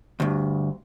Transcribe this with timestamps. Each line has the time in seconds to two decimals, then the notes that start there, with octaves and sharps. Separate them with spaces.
0.20 D2 G2